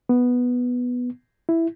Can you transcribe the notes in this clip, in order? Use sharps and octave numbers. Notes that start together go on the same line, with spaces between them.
B3
E4